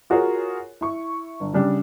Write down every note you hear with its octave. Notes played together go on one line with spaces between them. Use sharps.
F4 F#4 G#4 A#4 C#5
E4 C#6
G1
C#3 G3 D4